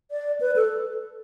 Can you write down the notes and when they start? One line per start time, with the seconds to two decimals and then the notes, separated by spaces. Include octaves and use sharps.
0.11 D5
0.41 B4
0.56 A4